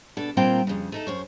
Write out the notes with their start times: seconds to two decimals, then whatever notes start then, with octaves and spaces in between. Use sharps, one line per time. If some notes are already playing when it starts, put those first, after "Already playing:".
0.17 B2 D4 A4
0.37 A#2 G3 A#3 C4 F4 G5
0.67 F2 C#3
0.92 A3 D#4 A4
1.07 F#2 C5 C#5